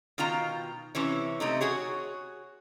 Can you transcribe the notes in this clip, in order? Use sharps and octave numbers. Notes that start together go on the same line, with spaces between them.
B2 D#3 F4 A#5
C3 E3 C#4
C3 A3 D#4
F#4 G#4 C#5